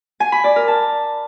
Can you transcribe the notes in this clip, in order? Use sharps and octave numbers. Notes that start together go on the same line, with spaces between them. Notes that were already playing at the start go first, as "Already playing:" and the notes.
G#5
B5
D5
A#4
A5